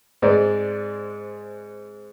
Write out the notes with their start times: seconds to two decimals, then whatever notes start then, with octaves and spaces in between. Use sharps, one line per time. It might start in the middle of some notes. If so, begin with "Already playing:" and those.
0.22 G#2 G#3 C4 D5